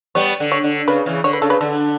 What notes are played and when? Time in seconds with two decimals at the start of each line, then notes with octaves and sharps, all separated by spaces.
0.15 G3 B3 C#5
0.40 D3
0.52 C#5
0.64 D3
0.88 C#3 B4
1.06 C#3 E3
1.24 D3 C#5
1.33 B4
1.42 C#3 A4
1.50 B4
1.61 D3 A4